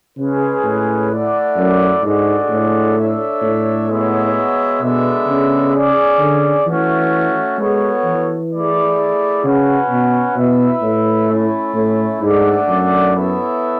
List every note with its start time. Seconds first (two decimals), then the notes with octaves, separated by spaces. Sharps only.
0.17 C#3 G#3 C#4 G#4 B4
0.64 A2
1.11 A3 E4 A4 D5 F#5
1.56 F#2
2.03 G#2 G#3 D4 F#4 A4 D5
2.49 A2
2.95 D4 A4 C#5 E5
3.42 A2
3.88 G#3 B3 F#4 C#5 E5
4.81 B2 G#3 B3 D4 A4 E5
5.27 C#3
5.74 C#4 G#4 D5
6.19 D3
6.65 E3 A3 C#4 F#4
7.58 G#3 B3 F#4 A4 C#5
8.05 E3
8.51 A3 E4 G#4 D5
9.43 C#3 C#4 F#4 B4 F#5
9.89 B2
10.36 B2 E4 B4 E5
10.82 A2
11.29 A3 C#4 E4
11.75 A2
12.21 G#2 A3 D4 A4 D5 F#5
12.68 F#2
13.13 B3 E4 A4 C#5 E5